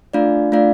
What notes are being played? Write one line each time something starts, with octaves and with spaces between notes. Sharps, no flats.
A3 D4 F4 D5 F5
A3 D4 F4 D5 F5